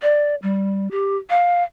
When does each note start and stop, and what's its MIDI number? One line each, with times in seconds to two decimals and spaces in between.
0.02 0.35 74
0.43 0.90 55
0.91 1.17 67
1.30 1.63 77